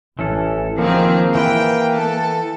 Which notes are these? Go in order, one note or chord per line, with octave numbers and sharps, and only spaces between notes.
A1 E3 C#4 A4
D#3 F3 A#3 C4 G#4
E3 B4 G5
A4